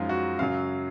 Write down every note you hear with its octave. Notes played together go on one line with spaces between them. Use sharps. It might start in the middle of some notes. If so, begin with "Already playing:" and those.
Already playing: F#2 F3 G#3 D#4 F4
F#4
F#2 C#3 F#3 F5